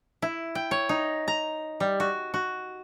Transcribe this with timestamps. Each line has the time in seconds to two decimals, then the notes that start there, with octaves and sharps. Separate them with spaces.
0.22 E4
0.55 G5
0.71 C#5
0.89 D#4
1.28 A#5
1.80 G3
2.00 F#4
2.34 F#4